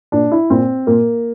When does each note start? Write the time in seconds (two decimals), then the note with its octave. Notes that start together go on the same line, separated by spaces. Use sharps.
0.12 A#2 D4
0.32 E4
0.50 A#2 C4
0.87 A#2 A#3